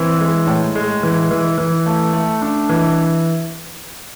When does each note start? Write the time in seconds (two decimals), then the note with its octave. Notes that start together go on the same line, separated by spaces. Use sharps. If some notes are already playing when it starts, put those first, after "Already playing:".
Already playing: E3 C4
0.20 G#3
0.47 A2
0.75 G#3
1.03 E3
1.31 E3
1.58 E3
1.86 A3
2.13 A3
2.42 D4
2.69 E3